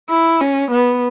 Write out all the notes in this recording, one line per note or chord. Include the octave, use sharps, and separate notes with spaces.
E4
C#4
B3